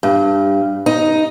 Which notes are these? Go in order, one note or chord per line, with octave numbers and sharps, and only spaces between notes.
G2
D#4